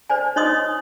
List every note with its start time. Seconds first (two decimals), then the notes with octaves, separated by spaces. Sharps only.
0.10 C5 D5 G#5
0.36 D#4 C#5 D#5 C6 D#6